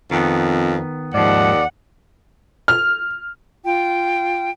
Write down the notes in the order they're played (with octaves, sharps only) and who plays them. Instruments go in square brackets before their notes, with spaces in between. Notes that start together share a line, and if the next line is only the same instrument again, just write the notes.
[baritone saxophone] F2 [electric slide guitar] D#3 B3
[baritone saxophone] D#2 [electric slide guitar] G#2 F3 [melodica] D5 [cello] F#5
[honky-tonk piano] F6
[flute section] F4 G5